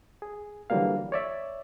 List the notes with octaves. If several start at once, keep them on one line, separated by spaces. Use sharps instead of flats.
G#4
D3 E3 F#3 G3 A#3 F5
C#5 D5 E5